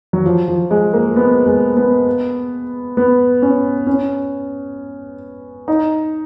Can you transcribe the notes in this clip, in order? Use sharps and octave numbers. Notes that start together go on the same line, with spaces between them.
F#3
F3
F3
G#3
A#3
B3
G#3
B3
B3
C#4
C#4
D#4